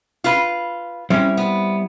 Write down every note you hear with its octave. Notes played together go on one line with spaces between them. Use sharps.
F4 B4
G3 C4 C#4 E4
B3